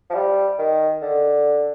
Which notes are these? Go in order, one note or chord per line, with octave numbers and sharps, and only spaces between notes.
F3
G3
D#3
D3